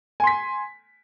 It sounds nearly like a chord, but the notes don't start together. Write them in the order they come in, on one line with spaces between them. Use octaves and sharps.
G#5 C6 B6